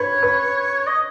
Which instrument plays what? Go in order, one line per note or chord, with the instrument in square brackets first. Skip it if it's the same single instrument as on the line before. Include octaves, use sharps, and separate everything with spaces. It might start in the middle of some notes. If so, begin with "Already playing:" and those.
Already playing: [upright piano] B4 [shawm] C#5
[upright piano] B4
[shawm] D#5